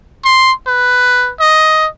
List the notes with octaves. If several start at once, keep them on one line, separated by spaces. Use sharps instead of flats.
C6
B4
D#5